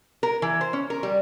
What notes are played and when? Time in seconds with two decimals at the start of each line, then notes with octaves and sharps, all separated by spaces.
0.23 A#4
0.42 E3
0.61 C5
0.73 C#4
0.90 A#4
1.03 G3